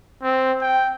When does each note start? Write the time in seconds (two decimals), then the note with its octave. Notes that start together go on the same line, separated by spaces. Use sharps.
0.23 C4
0.61 G5